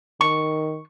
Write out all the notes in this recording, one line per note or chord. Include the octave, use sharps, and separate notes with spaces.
D#3 C#6